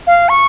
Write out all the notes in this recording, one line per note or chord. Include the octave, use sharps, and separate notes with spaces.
F5
C#6